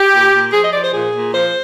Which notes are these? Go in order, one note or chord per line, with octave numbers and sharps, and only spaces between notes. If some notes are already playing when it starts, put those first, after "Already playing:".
Already playing: G4
A#2
A#2
F3 G#4
D#5
F3 D5
C5
A#2 G#4
A#2
F3 C5